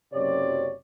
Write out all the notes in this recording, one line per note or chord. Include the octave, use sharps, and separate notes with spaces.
F#1 F#2 C3 C#5 D5